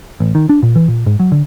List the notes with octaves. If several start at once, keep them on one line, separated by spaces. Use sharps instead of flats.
A1
D#3
D4
A#2
E3
A#2
G#2
F#3
D3